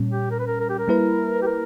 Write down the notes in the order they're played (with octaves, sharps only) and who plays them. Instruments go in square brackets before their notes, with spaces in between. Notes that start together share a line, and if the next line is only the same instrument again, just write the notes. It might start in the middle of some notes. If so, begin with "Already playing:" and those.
Already playing: [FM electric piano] A#2 G3 C#4
[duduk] G4
A#4
B4
A#4
A#4
G4
A#4
[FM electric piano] G3 A#3 E4 B4
[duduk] G4
A#4